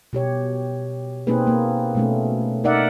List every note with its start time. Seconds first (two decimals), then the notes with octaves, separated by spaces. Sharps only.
0.13 B2 G4 C#5
1.27 B2 A#3 C4 D#4 G#4 B4
1.47 A#3
1.95 B2 A3 C#4
2.64 D#4 A#4 D5 E5 F#5